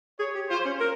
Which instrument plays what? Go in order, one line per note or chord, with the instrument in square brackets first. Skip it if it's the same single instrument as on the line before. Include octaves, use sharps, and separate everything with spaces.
[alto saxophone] G#4 [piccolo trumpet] C#5
[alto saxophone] G4
[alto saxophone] F4 [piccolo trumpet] C5
[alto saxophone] C#4
A#4